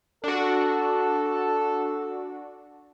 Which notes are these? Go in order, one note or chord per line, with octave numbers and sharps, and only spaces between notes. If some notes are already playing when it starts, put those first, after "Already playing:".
D4 F#4 A4